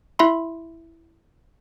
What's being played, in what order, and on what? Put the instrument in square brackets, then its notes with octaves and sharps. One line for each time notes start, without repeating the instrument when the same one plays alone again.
[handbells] E4 E5 B5 C6